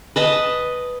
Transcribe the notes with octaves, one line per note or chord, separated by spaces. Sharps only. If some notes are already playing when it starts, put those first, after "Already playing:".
B4 D#5 A5